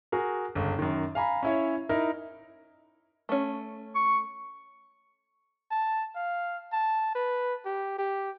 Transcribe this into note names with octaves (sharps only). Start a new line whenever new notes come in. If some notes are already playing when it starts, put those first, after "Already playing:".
F#4 G#4 A#4
G1 C#2
F#2 D#3
F5 G#5 A#5 B5
C#4 E4 C#5
D#4 E4 A#4
A3 C#4
C#6
A5
F5
A5
B4
G4
G4